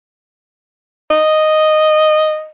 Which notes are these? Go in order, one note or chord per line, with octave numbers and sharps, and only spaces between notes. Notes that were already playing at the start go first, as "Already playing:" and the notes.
D#5